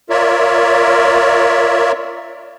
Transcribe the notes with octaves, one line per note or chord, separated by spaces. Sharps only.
F4 A#4 C#5 D5 E5